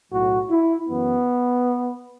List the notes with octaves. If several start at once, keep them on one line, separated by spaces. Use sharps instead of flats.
B1 A2 F#3 F#4
E4
F#2 E3 B3